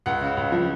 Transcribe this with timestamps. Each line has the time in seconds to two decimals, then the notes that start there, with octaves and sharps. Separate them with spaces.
0.06 C#2 F#5
0.21 C#3
0.37 C#2
0.52 F3